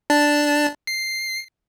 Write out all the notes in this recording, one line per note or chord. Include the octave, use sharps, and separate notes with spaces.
D4 A5
C7